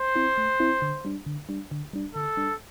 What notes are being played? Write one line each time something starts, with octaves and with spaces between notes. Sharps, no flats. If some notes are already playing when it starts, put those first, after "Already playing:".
Already playing: C5
C4 E4
A3
C4 E4
D3
G3 D4
D3
G3 D4
D3
G3 D4
D3 A4
G3 D4